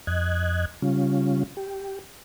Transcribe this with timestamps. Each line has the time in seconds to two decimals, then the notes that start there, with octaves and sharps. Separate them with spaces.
0.07 F2 D#5 F#6 G#6
0.82 C#3 G3 C#4 F4
1.57 G4